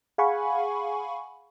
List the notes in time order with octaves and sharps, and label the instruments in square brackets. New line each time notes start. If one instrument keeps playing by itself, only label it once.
[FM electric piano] G#4 F5 F#5 G#5 B5 C#6